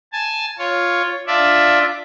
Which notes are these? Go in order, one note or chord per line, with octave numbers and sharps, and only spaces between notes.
G#5 A5
F4 C#5
D4 F4 D5 E5